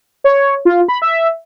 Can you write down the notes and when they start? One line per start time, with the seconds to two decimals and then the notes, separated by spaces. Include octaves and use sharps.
0.24 C#5
0.65 F4
0.88 B5
1.02 E5